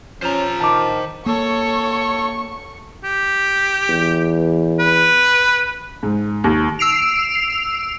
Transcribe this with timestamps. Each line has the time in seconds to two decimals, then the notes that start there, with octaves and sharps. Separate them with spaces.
0.22 F3 C#4 C5 A#5
0.60 D#3 A5 D6
1.26 A#3 A4 C#5 C#6
3.04 G4
3.89 E2
4.79 B4
6.03 G#2
6.44 D#2
6.79 E6 C7 D7 F7